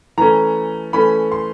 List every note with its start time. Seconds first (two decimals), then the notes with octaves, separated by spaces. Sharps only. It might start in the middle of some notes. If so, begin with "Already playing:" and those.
0.18 E3 A3 C#4 A#5
0.93 E3 A3 C#4 B5
1.32 C6